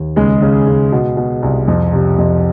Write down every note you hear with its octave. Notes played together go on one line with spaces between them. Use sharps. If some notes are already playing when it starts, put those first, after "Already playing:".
Already playing: D#2
C#2 G#3 G#4
C#3
C#2
B2
B2
C2
F2
C3
F2